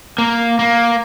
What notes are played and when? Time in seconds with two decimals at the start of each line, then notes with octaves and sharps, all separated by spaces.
0.18 A#3
0.59 A#3